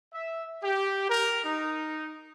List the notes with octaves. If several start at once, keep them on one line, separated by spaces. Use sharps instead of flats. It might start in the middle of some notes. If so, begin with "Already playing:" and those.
E5
G4
A#4
D#4